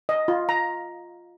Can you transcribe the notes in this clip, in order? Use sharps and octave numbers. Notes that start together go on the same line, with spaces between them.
D#5
F4
A#5